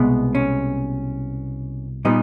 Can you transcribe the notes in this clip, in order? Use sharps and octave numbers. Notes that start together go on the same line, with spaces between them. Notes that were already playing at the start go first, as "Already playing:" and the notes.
Already playing: C2 B2 G#3 B3
C#4
A#2 G3 B3 D#4